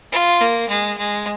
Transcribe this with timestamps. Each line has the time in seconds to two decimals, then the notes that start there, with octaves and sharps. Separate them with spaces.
0.12 F4
0.41 A#3
0.69 G#3
0.98 G#3